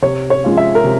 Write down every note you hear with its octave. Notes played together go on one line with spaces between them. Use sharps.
C3 C#5
C#5
F3 G#3 C#4 F4
E5
A#4
C3